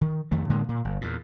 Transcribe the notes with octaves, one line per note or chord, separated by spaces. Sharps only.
D#3
F2 D#3 A3
A2 D3 G#3 A#3
A#2
G1
E2 A#2